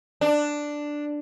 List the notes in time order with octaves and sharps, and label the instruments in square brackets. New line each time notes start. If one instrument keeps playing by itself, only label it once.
[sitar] D4